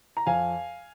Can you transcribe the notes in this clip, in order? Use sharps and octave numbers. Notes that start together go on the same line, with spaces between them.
A#5
F2 F5 G#5